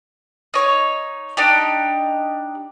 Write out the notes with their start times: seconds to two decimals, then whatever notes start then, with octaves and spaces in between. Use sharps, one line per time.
0.54 D#4 C#5
1.37 D4 D#4 G4